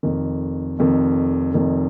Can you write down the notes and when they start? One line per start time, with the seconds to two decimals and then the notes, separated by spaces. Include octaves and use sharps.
0.03 F1 F2 D#3
0.79 F1 F2 D#3
1.54 F1 F2 D#3